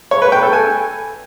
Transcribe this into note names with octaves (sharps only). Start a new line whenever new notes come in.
C#5
B4
G5
A4
G#5